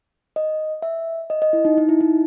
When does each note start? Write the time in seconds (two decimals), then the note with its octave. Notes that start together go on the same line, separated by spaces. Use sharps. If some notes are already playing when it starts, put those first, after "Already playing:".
0.36 D#5
0.82 E5
1.30 D#5
1.42 D#5
1.53 E4
1.65 D#4
1.78 D#4
1.89 E4
2.01 D#4